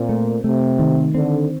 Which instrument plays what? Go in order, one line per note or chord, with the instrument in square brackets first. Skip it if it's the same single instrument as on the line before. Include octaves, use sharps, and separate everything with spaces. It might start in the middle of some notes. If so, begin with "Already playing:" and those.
Already playing: [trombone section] A#2 [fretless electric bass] C4
[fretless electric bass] A3
[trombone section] C3 [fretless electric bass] A3
[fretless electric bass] D#3
[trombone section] D3 [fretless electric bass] C4